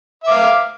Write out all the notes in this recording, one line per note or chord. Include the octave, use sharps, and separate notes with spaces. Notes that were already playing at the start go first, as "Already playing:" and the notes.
E5 F5 D6